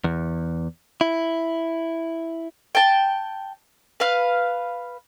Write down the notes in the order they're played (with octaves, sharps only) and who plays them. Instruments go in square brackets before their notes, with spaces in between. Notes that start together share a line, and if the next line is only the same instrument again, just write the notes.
[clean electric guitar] E2
E4
[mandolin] G5 A5
B4 F5